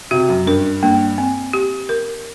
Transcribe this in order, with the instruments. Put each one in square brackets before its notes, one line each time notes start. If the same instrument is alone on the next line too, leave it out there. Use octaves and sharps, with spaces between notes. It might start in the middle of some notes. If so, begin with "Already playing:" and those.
[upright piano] C3 [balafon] F#4
[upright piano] F#2
[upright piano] G2 [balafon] A#4
[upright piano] G2 [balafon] A#3
[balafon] C4
G4
A#4